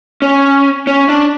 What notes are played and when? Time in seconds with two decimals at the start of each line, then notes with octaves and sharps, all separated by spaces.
0.22 C#4
0.87 C#4
1.09 D4